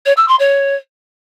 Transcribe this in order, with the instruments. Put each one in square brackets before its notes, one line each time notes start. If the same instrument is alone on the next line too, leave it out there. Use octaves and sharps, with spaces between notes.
[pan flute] C#5
E6
C6
C#5